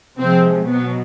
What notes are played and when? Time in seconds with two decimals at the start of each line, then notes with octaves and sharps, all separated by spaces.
0.18 C3 F3 G#3 C4
0.65 B2 F#3 B3